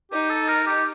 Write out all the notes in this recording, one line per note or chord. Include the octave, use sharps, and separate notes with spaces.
D#4 G4
A4
A#4
G4